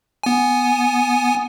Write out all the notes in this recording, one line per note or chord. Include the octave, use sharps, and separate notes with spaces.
B3 G#5